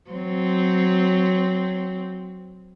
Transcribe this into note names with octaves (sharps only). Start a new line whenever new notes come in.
F#3 C4